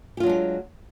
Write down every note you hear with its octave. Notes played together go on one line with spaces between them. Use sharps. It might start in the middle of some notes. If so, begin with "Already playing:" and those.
F#3 G#3 D4 F4 G4